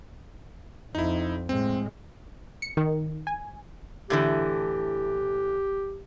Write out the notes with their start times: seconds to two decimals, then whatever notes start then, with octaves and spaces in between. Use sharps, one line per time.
0.95 F2 D#4 E4
1.49 A2 G#3 C4
2.62 C#7
2.77 D#3
3.27 G#5
4.10 A2 D3 E3 G4